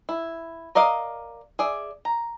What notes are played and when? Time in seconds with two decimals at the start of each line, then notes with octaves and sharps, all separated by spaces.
0.09 E4
0.75 A#4 D5 D#5 F5
1.59 G#4 D5 E5
2.05 A#5